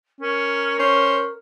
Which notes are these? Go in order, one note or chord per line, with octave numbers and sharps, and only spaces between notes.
C#4 A#4
C#4 C5